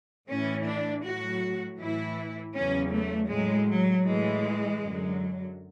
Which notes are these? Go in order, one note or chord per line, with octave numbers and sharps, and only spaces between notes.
A2 E3 C#4
D4
A2 F#3 F#4
A2 E3 E4
E2 C#3 F#3 C#4
A3
A2 F#3 G#3
F#3
A2 E3 G#3
F#2 D3 F#3